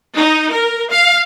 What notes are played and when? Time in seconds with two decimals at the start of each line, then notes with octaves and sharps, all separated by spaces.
0.16 D#4
0.51 A#4
0.91 F5